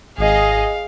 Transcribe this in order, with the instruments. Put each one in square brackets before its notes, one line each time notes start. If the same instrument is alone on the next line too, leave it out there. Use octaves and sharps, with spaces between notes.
[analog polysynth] G#1 D#5 [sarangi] G#4 [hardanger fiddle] F5